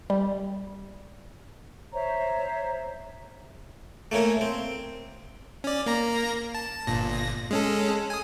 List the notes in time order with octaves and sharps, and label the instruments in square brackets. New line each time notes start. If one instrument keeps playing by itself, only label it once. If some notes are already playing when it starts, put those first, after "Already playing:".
[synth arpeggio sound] G3
[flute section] C5 C#5 E5 A#5
[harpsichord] A3 A#3 C#4 A#4
C4
[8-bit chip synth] C#4 D5
A#3 A#5 A#6
A5
G1 A#2 A#6
G#3 C#4 A4
G#5 D#6